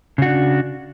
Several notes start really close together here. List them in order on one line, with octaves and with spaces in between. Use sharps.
C#3 F#4 D4